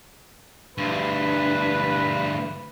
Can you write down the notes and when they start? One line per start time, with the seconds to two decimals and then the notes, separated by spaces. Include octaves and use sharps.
0.78 D2 G2 B4